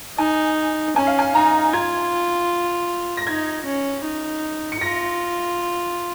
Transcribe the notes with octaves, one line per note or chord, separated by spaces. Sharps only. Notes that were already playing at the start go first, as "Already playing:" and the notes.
D#4 G#5
C#4 G#5
F5
G#5
D#4 A#5
F4 G#6
A#6
D#4 G#6
C#4
D#4
C#7
F4 A#6